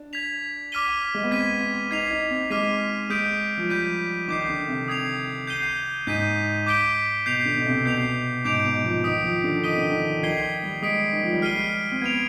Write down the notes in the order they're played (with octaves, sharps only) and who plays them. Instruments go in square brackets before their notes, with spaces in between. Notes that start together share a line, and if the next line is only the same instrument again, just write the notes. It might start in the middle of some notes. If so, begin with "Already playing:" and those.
Already playing: [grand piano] D4
[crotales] G#6 B6 F7
D6 F6 B6 D#7 G7
[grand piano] G#3
B3
[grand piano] C4 [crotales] G#6 B6 D#7
[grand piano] B3
[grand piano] D#4 [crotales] G#6 C7 F7
[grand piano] D#4
C4
[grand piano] G#3 [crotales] D6 F6 B6 D#7
[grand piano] G#3 [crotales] D#6 G6 B6 D7
[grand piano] F3
[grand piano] G3 [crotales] G6 B6 D#7
[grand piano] D#3 [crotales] D6 G6 C7
[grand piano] D3
C3
[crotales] D#6 G#6 C7 F7
G6 C7 D#7 G7
[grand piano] G#2 [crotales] G6 B6 D#7
[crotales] D6 G6 B6 D7 G7
[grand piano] B2 [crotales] G6 C7 F7
[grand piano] D3
B2
C3
[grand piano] B2 [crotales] G6 C7 F7
[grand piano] G#2 [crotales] D6 G6 D7 F7
[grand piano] B2
F3
[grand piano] D#3 [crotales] D#6 B6 D7
[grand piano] F3
D3
[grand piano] D#3 [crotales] D#6 B6 D#7 G7
[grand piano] D3
D#3
F3
[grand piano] D#3 [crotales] G#6 C7 G7
[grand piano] G3
[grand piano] G#3 [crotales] D#6 B6 D7
[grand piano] D#3
F3
G3
[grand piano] G#3 [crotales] F6 C7 D#7 G7
[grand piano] C4
[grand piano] B3 [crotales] G#6 D7 F7